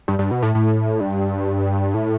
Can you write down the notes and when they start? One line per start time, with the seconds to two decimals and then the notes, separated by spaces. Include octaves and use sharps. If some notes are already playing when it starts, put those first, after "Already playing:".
0.08 G2
0.19 G2
0.31 B2
0.43 A2
0.55 A2
1.00 G2
1.94 A2